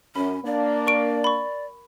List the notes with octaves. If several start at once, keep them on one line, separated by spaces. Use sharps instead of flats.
F#2 C#4 B5
A#3 D4 D5
A#4 C#6 D7
B5 C#6